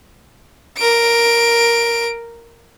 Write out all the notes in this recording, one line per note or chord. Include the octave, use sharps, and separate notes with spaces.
A#4 D7